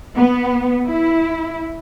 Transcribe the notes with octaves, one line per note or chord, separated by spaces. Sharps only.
B3
E4